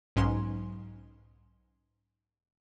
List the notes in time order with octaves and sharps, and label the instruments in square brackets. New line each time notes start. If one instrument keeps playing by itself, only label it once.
[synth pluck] B1 G#2 C#4 C6